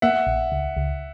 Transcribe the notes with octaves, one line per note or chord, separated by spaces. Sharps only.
A#3 E5 F#5
A#1
C#2
C#2